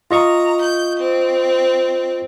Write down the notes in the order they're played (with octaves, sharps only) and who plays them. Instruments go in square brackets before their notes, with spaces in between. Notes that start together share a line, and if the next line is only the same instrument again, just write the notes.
[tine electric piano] F4 D#5 C#6 [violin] A#5
[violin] G6
C4